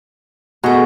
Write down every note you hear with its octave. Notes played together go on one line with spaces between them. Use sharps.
B2 G#3 A3 F#4 G#4